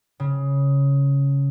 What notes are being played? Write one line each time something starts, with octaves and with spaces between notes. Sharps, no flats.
C#3